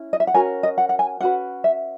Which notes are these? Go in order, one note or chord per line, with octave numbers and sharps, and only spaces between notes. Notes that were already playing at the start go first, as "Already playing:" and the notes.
Already playing: C#4 E4
D#5
E5
F#5
C#4 F#4 A#4 G#5
D#5
F#5
F#5
G#5
C#4 F#4 B4 F#5
E5